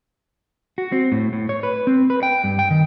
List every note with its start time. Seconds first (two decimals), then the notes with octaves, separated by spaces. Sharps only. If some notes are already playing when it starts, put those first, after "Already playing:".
0.78 F#4
0.92 C4
1.12 A2
1.33 A2
1.49 C#5
1.63 B4
1.87 C4
2.10 B4
2.23 G5
2.44 G2
2.59 G5
2.70 D#3